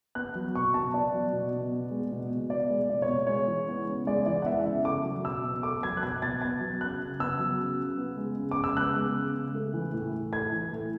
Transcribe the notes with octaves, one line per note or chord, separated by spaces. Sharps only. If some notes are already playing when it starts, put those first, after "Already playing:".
B3 F#6
F#3
B2 C#6
B2 A5
B3 D5
F#3
B2
B2
B3
G#3
B2
B2
B3 D5
G#3
B2 D5
C#5
B2
G#3 C#5
E3
B3
C#3
G#3 D5
E3 D5
F#5
B3 E5
C#3 E5
A3 D6
F#3
B2 E6
B2
A3 D6
F#3 G#6
F#6
B2 G#6
B2 A6
B3 G#6
F#3
C#3 F#6
C#3
B3 E6
F#3
C#3
C#3
B3
G#3
C#3
D6
C#3
E6
B3 F#6
G#3
C#3
C#3
A3
E3
A2
A2
A3 G#6
E3
A2